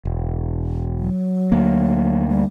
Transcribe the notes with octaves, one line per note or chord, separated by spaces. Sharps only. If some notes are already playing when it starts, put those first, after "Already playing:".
E1
F#3
D2 A#3
G3